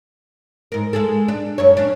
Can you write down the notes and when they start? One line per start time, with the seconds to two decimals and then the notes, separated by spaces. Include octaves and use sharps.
0.72 G#2 A#4
0.93 G#3 G#4 A4
1.28 D4
1.58 F#2 C#5
1.77 C#4 D4